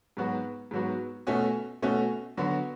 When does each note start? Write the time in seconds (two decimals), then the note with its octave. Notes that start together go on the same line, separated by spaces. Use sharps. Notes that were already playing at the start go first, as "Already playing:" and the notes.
0.17 G#2 F#3 B3 F#4
0.71 G#2 F#3 B3 F#4
1.27 B2 A3 C#4 F#4
1.82 B2 A3 C#4 F#4
2.37 D3 F#3 B3 F#4